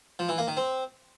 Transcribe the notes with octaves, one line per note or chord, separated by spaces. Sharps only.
F3
E3
A#3
D#3
C4